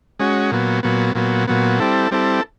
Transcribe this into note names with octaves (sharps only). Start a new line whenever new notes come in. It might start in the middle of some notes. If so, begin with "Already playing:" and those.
G#3 C#4 F#4
A#2 F#3 B3
A#2 F#3 B3
A#2 F#3 B3
A#2 F#3 B3
G3 C4 E4 A4
G3 C4 E4 A4